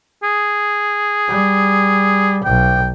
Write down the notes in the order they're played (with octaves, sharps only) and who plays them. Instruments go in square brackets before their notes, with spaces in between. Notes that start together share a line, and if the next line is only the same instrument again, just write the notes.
[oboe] G#4
[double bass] G3
[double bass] B1 [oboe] G5